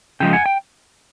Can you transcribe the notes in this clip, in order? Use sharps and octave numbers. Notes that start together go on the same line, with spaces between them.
C#3 F3 G#3 G5
F#5 G#5
G5